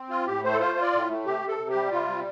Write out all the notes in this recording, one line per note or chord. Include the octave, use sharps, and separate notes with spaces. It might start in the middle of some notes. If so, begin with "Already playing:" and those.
Already playing: C4
F4
A2 G4
A3 C5
A4
F4 C5
F4
D5
A2
A3
C3 G4
C3
A4
C3
G4
G3
C3 F4
G3